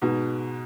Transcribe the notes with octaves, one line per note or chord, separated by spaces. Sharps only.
G#2 B2